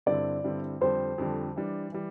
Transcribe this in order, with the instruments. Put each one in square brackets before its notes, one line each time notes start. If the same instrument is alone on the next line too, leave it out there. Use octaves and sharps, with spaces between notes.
[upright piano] G2 D3 G3 C4 E4 [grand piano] D5
[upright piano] G2 D3 G3 C4 E4
[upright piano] F2 D3 G3 [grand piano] C5
[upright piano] F2 D3 G3
E3 G3 D4
E3 G3